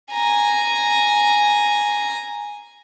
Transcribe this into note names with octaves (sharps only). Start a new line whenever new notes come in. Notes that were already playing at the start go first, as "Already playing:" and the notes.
G#5 A#5